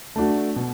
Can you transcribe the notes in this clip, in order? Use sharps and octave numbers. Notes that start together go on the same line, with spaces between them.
A3 D4 F#4
B2